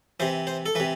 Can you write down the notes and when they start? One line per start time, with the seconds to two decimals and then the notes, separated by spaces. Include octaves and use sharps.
0.20 C3 E3 C5
0.47 C5
0.66 A4
0.75 E3 B4
0.80 C3